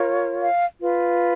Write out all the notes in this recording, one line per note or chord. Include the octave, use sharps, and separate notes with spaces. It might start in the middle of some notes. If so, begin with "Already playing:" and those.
Already playing: F4 A#4 C#5
F5
F4 B4